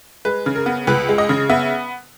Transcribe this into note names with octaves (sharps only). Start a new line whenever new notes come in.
G#3 B4
C#3
A#4
B3
C#2 B4
G#3
D#5
C#3
B3 E5